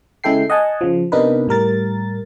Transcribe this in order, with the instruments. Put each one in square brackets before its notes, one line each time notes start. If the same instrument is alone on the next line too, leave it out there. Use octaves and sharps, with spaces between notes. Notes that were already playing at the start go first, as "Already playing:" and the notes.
[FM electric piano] C#3 G#3 E4 A4 G5 C7
D#5 F#5 G#5 A5
C#3 F3
C3 B3 D4 D#4 A#4 B4
A2 G3 A#4 A6